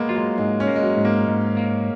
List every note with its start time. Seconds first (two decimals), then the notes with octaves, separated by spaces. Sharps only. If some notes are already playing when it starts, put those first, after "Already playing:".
Already playing: G#3 A#3 B3
0.09 F#3 F4
0.16 G#3
0.38 G#2 G#3
0.60 C#4
0.67 A#3
0.76 G#3
0.82 F#3
0.97 G#2
1.05 A#3
1.28 G#2
1.57 A#3